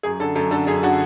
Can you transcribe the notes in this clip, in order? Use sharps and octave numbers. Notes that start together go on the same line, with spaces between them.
F#2 G#4
D3 A4
F#2 A4
D3 A4
F#2 G#4
D3 F#4